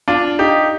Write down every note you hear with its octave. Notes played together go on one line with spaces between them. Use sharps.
D4 F4
D#4 G4